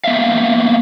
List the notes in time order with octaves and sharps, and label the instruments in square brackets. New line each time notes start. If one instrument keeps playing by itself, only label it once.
[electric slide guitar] A#3 B3 E5 F5